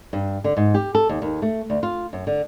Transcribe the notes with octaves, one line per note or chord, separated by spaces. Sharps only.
G2
D3
G#2
G4
A4
D#2
D#2
A3
D2
F4
F#2
D3